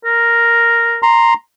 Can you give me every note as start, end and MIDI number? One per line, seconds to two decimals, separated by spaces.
0.05 0.99 70
1.03 1.34 82
1.03 1.34 84